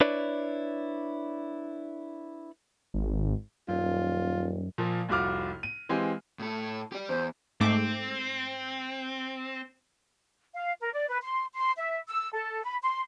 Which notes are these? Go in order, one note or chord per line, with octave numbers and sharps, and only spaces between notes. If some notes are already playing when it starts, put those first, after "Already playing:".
D4 E4 B4 C#5 D5
G#1
D#1 F#2 F4
A#2 F3 A#3
F1 C2 F4 F#4 D6 F6
D#7
E3 G#3 C4 G4 F5 G#5
A2 A4
G4 D5
E2 C5
G#2 A3 C4 D6
F5
A#4
D5
B4
C6
C6
E5
E6
A4
B5
C6